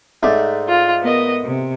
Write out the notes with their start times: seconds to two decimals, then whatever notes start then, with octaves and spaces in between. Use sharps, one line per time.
0.23 G#2 A3 D5
0.67 F4
1.02 B3 A#4 D#5
1.43 C3